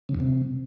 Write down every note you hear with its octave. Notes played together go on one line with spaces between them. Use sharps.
C#3
E2
C3